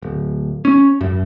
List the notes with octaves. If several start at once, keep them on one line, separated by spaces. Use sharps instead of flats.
D1
C#4
F#2